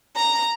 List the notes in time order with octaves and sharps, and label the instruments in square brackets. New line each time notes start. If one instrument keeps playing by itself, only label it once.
[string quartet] A#5